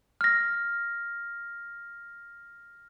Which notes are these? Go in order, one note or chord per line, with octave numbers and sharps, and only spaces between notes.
F6 A#6